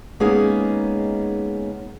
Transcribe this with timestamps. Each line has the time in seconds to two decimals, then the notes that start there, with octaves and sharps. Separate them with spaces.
0.20 G#3 A#3 B3 C#4 D#4 G#4